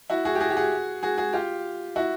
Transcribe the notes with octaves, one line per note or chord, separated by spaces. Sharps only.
E4 F#4
F#4 G#4
G4
F#4 G#4
G4
F#4 G#4
F#4 G#4
F#4 G#4
F4 G4
E4 F#4